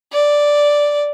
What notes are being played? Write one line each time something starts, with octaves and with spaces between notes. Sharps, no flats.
D5